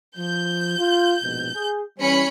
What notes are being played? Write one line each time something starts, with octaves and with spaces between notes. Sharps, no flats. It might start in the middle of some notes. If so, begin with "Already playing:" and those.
F3 G6
F4
A#1 G#2 B2
G#4
E3 G3 C#4 B5 C#7